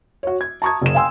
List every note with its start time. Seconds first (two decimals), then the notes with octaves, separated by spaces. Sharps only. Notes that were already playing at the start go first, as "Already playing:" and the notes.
0.23 F#4 C#5
0.41 G#6
0.62 A5 A#5 C#6 D#6 G#6
0.82 F#1 E7
0.94 F5 G5 G#5 C6 E6